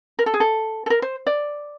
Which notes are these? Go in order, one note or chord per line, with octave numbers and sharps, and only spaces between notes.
A#4
A4
G#4
A4
A4
A#4
C5
D5